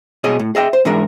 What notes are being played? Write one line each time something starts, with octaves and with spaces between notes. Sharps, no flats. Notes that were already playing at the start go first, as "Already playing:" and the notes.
B2 G#4 C#5 D#5
A2
G#4 D#5 E5 G5
C5
G#2 E3 G#3 D4 A#4 E5